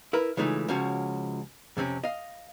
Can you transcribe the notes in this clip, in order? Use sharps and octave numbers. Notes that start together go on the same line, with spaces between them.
E4 A#4 B4
C#3 E3 G#3 A3 D#4 F4
C#2 F3 C#4 F#4
F2 C3 C4 C#4
D#5 F5